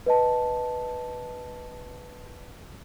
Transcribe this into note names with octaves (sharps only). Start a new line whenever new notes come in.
B4 D#5 A5